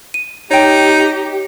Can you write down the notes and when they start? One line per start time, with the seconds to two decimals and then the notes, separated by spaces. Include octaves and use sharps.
0.14 D#7
0.51 D#4 G4 C#5 G5